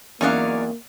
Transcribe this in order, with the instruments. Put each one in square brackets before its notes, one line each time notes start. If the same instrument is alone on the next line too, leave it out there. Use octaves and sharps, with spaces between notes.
[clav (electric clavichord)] E2 [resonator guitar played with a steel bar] F#3 C#4 [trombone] A#3 [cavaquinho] D#4 D5 F5